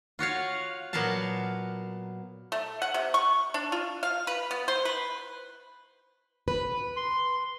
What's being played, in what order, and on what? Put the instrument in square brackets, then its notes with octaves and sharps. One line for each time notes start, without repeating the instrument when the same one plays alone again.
[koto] F4 F#4 C#5 F5
A#2 F#3 B3 A#4 F5 A5
[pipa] A3
F#5
C3
C#6
D4
F4
F5
B4
B3
C5
B4
[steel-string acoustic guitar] B4
[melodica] C6